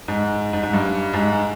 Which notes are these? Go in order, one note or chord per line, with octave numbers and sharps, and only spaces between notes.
G#2
G#2
G#2
G2
G#2